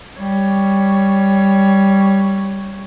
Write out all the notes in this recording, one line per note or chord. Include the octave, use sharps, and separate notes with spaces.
G3 C#5